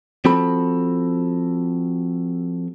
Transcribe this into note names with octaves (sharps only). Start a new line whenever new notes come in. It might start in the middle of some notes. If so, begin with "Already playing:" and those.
F3 C4 F#4 A4 B5